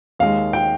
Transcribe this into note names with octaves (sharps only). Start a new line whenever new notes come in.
D#2 D#3 G#3 F5
G5